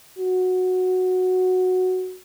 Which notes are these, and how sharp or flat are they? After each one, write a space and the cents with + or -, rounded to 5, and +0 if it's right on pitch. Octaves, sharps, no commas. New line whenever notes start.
F#4 -5